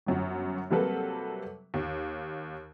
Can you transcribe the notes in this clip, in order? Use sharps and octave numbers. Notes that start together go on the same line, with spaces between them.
G1 F#2 F#4
C3 F#3 G3 A#3 A4 B4
D#2